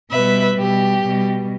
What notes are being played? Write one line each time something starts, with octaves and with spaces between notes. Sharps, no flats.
B2 G3 B4 E5
B2 G3 G4
B2 G3